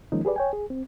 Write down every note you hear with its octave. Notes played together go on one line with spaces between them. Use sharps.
D#3 F3 G#3 A#3 C#4 D#4
G4 G#4 B4 D5
C#5 G5 G#5
G#4
C4